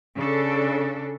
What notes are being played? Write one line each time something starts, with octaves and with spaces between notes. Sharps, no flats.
C#3 D4 A4